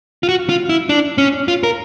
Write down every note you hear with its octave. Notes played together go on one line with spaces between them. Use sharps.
F4
F#4
F4
E4
D4
C#4
F4
A#4